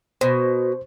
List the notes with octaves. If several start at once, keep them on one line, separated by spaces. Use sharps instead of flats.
B2 C5